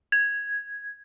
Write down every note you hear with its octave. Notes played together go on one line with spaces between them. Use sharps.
G#6